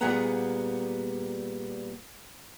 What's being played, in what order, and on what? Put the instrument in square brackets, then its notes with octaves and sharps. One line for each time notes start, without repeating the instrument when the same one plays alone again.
[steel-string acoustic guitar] A#2 G3 B3 G#4 F#5 A#5